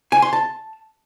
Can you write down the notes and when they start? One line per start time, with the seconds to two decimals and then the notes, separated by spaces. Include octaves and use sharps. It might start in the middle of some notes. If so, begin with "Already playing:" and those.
0.12 G#5
0.22 C6
0.33 A5